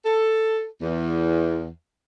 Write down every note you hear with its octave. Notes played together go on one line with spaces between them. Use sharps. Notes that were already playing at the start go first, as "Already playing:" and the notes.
A4
E2